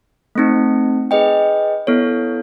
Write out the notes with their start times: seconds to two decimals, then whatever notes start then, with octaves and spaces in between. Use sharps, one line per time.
0.35 A3 C4 D#4
1.11 G#4 B4 D#5 G5
1.87 B3 E4 A4 C#5